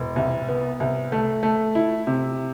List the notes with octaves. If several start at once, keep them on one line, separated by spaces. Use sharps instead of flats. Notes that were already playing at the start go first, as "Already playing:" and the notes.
Already playing: E1
C2
B3
C2
A3
A3
E4
C3